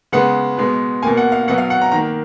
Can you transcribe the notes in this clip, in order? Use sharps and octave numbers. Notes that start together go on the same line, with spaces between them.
C#3 G#3 B3 F#5
B2 G#3 B3
B2 A#3 G#5
F#5
F5
B2 F#3 B3 F#5
F5
F#5
A#5
D#3 A#3 A#5